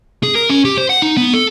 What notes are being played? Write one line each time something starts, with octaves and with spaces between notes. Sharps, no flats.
G#4
A#4
C#4
G4
C5
F#5
D#4
B3
A4